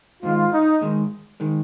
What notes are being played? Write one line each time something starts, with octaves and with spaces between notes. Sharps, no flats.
G#2 D#3 G#3 F4
D#4
G#2 D#3 G#3
D#3 G#3